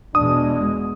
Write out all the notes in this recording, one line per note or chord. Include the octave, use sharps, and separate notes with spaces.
E2 B2 G#3 D4 D#6